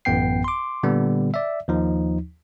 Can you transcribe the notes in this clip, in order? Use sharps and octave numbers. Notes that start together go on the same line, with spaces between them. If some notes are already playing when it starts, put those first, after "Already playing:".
A1 F#2 B3 G5 C7
C6 D6
A#2 D3 G3 B3
D5 E5
D#2 F3 D#4